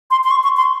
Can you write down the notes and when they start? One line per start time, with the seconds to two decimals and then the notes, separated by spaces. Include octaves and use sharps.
0.11 C6
0.24 C6
0.31 C#6
0.43 C#6
0.57 C6